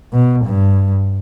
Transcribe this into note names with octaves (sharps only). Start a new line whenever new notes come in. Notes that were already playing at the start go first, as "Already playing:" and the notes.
B2
G2